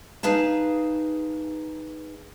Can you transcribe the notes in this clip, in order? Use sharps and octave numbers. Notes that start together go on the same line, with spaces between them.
D#4 G#4 B4 F5 A5